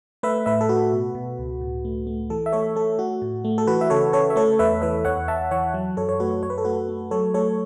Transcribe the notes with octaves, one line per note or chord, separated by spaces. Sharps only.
A3 B4 E5
A2 B4 E5
A4
A3 F#4 B4
B2
B2
C#2
A2
A3
A3
E3 A4
E5
A3 A4 C#5
A3 A4
A3 F#4
A2
A3
A4
E3 F#4 B4
E5
C#3 A4 C#5
C#3 A4 C#5
E5
A3 A4 C#5
E2 B4 E5
E3 B4 E5
E2 C#5 F#5
E2 E5 A5
E3 C#5 F#5
F#3
F#2 A4 C#5
C#5
A3 F#4 B4
F#2 C#5
B4
A4
A3 F#4 B4
A3
F#3 A4 C#5
A3 A4 C#5